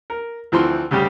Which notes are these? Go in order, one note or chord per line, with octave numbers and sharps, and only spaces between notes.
A#4
D2 E3 F3 C4 C6
D2 C#3 G3 G4